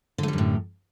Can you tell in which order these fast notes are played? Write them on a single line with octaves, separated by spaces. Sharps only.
D3 A3 G3 F#2 A2